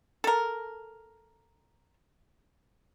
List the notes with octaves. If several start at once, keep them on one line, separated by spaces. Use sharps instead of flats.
A4 A#4